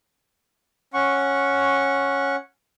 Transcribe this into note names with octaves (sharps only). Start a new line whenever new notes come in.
C#4 F#5 C#6